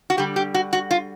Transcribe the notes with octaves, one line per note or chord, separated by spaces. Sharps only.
F#4
D3 G3 G4
G4
F#4
F#4
F4